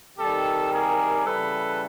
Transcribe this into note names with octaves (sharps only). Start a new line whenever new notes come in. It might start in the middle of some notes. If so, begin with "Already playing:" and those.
C3 D#3 G3 G4 A4
G#4 A#4
C#3 E3 G3 A4 B4